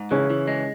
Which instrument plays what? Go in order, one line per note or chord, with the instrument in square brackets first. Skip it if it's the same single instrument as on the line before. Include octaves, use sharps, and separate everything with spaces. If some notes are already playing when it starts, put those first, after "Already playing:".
Already playing: [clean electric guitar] G#2
[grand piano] C#3 C#4 [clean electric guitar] E3
[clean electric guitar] E3
G#3